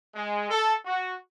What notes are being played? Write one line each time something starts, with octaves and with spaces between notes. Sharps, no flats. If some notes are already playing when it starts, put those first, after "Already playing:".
G#3
A4
F#4